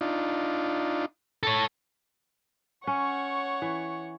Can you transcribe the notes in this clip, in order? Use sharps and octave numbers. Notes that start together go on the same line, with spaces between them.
D4 D#4 F4
A4 C#5
C#4 C#5 F#5 C#6
E3